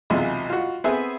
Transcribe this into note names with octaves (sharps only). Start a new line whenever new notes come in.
B1 E2 C3 G#3 F4
F4 F#4
B3 C4 G#4 E5